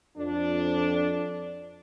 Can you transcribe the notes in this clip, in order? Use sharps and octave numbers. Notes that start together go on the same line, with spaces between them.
F2 D4